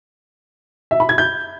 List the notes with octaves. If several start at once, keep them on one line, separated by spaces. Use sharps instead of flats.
E5
B5
G#6
G6